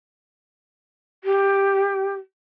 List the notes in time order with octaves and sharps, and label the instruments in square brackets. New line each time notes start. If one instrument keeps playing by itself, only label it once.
[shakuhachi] G4